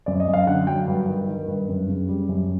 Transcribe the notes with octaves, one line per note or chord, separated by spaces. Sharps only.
F#2 D5
D#5
F#2
F5
D3 F#5
F#3 G5
G2
D#3
D#3
G2
F#2
C#3
G3
F#2